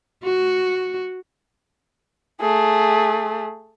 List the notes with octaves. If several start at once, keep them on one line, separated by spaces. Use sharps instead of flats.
F#4
A3 G#4